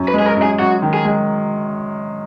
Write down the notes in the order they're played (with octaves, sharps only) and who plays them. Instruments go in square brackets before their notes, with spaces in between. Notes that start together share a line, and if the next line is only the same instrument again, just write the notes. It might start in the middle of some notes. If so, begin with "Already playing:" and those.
Already playing: [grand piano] F#2
[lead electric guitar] B4
[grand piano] G#3
[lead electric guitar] G#4
A#4
[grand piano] F#2
[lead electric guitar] G#4
[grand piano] F#2 [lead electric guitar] F#4
[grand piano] D#3
[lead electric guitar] G#4
[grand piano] G#3